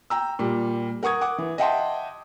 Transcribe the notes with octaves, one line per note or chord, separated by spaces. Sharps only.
G5 A#5 E6
A#2 G3
A#4 F#5 C#6 D#6 G#6
F#5 D6
E3
D#5 E5 F#5 G5 A5 C6